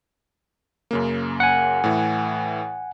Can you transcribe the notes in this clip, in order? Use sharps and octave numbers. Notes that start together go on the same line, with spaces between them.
F#2 C#3 A#3
F#5 G#5
A2 E3